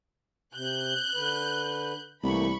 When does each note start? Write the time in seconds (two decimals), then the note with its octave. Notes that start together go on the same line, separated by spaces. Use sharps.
0.54 C3 F#6 G6
1.14 D3 B4
2.23 C2 E3 A3 A#3 B5 C#6